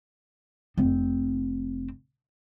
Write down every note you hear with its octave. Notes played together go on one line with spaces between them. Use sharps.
F1 C4